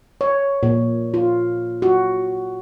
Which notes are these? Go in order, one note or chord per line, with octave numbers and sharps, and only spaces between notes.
C#5
A#2
F4
F#4